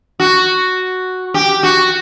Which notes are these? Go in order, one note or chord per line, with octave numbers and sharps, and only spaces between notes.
F#4
G4
F#4